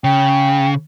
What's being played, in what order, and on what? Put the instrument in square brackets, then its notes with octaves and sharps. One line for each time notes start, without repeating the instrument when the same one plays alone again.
[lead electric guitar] C#3 [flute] G5